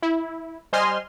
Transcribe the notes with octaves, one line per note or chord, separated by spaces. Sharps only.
E4
G3 C5 D#5 G#5 C6 F6